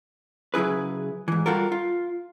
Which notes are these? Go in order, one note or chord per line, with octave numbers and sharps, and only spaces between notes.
C#3 F#3 E4 G#4 B4
G#2 E3
G3 F4 F#4 A4 A#4
F4